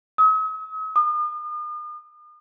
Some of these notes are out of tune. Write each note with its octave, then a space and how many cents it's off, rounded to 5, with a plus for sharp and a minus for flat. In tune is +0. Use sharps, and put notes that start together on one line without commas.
D#6 +45
D#6 -40